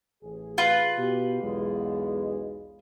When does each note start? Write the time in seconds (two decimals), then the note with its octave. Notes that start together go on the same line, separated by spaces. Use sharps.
0.23 A1 G#4
0.58 F4 B4
0.98 B2 G4
1.42 B1 E2 G#3